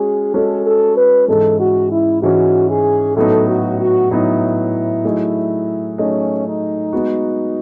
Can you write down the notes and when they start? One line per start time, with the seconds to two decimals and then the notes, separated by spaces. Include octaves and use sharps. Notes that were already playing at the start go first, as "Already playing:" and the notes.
Already playing: G#3 C#4 F#4 G#4
0.34 G#3 C#4 F#4 A4 C#5
0.65 A4
0.96 B4
1.28 G#2 E3 G#3 C#4 A4
1.59 F#4
1.91 E4
2.22 G#2 E3 G#3 C#4 F#4
2.69 G#4
3.16 A2 F#3 B3 D#4 A4
3.48 F#4
3.79 F#4
4.10 A2 F#3 B3 D#4 E4
5.04 F#3 A3 D#4 G#4 D#5
5.98 F#3 A3 C#4 D#4 G#4 D#5
6.46 D#4
6.93 G#3 B3 F#4